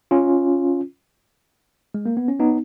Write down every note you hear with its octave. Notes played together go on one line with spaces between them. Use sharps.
C#4 F4
G#3
A#3
B3
C#4
B3 D#4